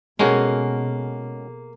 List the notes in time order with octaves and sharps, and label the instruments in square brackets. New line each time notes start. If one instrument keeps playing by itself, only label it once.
[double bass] B2 [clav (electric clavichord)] G#3 C#4 F#4 [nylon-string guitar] A#3 G#4 A4